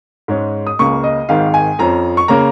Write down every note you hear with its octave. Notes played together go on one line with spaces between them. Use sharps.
G#2 G#3 C#4
D#6
C#2 C#3 A#3 C#6
D#5
G#1 G#2 D#3 F5
G#5
F2 F3 C#4 A#5
C#6
C#3 A#3 C#4 A#5